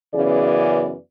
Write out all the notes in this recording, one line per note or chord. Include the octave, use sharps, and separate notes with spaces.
F#2 C#3 E3 B3 G#4 D5